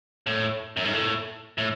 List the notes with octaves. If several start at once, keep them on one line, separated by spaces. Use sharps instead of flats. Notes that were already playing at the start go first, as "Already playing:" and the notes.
A2
F#2
G#2
A2
A2